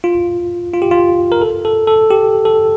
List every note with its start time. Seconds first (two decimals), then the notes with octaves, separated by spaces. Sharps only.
0.04 F4
0.73 F4
0.82 G4
0.91 F4
1.32 A#4
1.42 A4
1.65 A4
1.87 A4
2.11 G4
2.45 A4